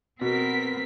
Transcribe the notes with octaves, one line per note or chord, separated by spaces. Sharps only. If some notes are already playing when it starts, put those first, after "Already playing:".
B2 B3 C4 A#4 B6